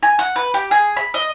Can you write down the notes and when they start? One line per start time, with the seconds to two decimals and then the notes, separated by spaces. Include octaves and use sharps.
0.03 G#5
0.19 F#5
0.36 B4
0.54 G4
0.71 G#4
0.97 B5
1.14 D#5